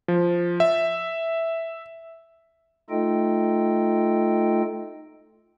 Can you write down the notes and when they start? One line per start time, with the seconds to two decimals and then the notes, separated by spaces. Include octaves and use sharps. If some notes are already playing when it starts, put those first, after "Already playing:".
0.08 F3
0.60 E5
2.90 A3 D#4 F4 A4 D#5 G5